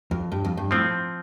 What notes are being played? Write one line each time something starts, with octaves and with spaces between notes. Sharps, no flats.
F2
G2
F2
G2
A2 F3 C4